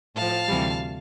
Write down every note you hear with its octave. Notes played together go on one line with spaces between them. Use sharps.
A2 F3 F5 A5
D2 C3 E3 G3